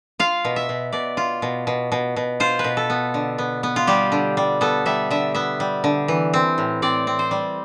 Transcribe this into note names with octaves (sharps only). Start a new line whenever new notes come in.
F4 F5
B2
E5
B2
B2 D5
F4
B2
B2
B2
B2
F4 C5
B4
B2
A4
B3
D3
B3
B3
F4
G3 G4
D3
G3
B3 A4
G3 E5
D3 E5
B3 E5
G3
D3
E3
C4
A2
C4 D5
C4
C5
G3